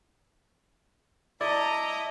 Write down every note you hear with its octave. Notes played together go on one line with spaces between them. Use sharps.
E4 D5 D#5 A5 A#5